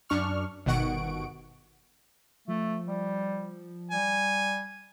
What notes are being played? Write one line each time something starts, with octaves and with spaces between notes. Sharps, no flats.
F#2 D4 C#6 F6
G1 B2 D#3 F#5 C#6 D7
F3 A3
G3
G3 G#5